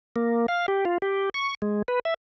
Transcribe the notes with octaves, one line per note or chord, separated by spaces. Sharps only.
A#3
F5
G4
F4
G4
C#6
G#3
B4
E5